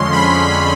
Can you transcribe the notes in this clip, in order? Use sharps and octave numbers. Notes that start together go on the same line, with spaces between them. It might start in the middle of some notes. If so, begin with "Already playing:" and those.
Already playing: F2 D3 F3 G#3 C#4 C6
B5